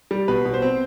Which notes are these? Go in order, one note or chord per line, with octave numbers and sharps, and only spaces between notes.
G3
B2 B4
B2
C5
C4